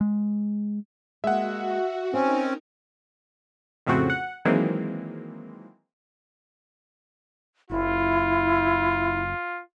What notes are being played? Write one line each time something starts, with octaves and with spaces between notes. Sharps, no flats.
G#3
G#3 A#3 F#4 E5 F#5
C4 C#4 D#4 A#4 C5 E5
F2 A2 C#3 A3 C4 F#4
F#5
D#3 E3 F#3 G#3 A#3 C4
F#1 E4 F4